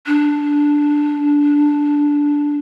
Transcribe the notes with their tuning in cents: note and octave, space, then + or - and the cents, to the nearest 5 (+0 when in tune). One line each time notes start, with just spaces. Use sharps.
D4 -5